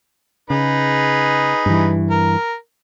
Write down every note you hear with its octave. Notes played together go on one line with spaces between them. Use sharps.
C#3 D#4 G#4 B4
G2 E3
A#4